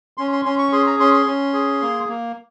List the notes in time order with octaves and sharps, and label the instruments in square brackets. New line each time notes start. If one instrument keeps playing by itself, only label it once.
[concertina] C#4 C6
C6
C#4 C6
C#6
G#4 C6
A#5
C#4 C6
C6
C#4
G#4
A#3
A#3